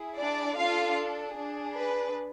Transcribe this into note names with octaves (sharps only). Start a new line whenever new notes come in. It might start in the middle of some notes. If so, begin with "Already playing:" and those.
Already playing: E4 G#4
D4 D5
D4 F4 A4 F5
D4 G#4
B4